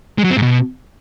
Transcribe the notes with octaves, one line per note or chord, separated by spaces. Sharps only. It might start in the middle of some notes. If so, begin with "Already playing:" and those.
G#3
F#3
C4
G#2
B2